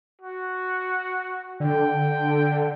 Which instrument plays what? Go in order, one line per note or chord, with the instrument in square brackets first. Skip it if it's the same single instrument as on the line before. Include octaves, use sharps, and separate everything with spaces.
[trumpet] F#4
[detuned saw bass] D3 [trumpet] G5